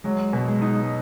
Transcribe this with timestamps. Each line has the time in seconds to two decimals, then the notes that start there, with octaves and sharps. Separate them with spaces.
0.04 F#3 G#3
0.33 B2
0.48 G#3
0.62 D#4